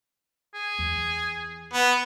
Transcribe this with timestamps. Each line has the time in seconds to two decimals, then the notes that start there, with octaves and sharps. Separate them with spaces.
0.54 G#4
0.79 E2
1.74 B3